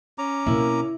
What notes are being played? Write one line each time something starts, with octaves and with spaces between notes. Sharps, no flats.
C#4 A#5 D6
B2 A#3 C4 E4